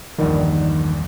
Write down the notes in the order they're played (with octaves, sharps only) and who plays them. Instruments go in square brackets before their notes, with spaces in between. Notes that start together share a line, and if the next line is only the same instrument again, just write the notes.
[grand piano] A#1 E2 G2 [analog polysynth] D#3